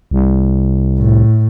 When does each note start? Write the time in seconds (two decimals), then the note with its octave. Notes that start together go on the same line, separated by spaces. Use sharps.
0.11 C2
0.99 A2